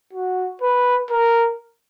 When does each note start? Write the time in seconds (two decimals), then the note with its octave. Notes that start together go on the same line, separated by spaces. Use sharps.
0.13 F#4
0.61 B4
1.11 A#4